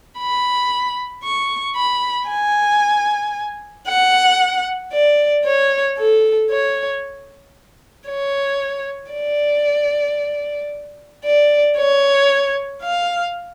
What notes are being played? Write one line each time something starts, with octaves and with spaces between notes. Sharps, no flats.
B5
C#6
B5
G#5
F#5
D5
C#5
A4
C#5
C#5
D5
D5
C#5
F5